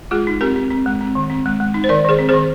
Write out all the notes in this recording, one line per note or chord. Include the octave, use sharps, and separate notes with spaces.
G#3 F4 G#4
D#4
C4 G4 A#4
C4
C4
G#3
C4
D#3
C4
G#3
G#3
D#4
C5
D#3 A#4 D5
D#3 G#4 C5
C4
G#4 C5
D#3